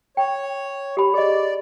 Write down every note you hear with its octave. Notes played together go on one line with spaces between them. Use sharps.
C#5 G5
G4 B5
G#4 D5 D#5